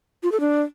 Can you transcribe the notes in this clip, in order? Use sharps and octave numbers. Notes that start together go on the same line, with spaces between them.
F4
A4
D4